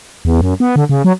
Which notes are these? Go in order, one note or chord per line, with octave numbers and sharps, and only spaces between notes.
E2
F#2
B3
D3
C#3
F#3